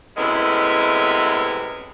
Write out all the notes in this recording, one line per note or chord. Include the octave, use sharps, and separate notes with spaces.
F#2 A2 C3 G#3 B3 E4